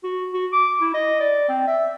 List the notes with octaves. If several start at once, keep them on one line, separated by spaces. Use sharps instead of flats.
F#4
F#4
D6
E4
D#5
D5
C4
E5